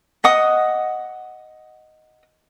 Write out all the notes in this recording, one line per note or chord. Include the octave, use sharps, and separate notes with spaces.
D#5 F#5 D#6